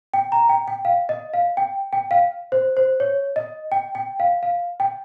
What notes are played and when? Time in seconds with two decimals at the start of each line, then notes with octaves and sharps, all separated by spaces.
0.14 G5
0.32 A#5
0.49 G5
0.68 G5
0.85 F5
1.09 D#5
1.34 F5
1.57 G5
1.93 G5
2.11 F5
2.52 C5
2.77 C5
3.00 C#5
3.36 D#5
3.72 G5
3.95 G5
4.20 F5
4.43 F5
4.80 G5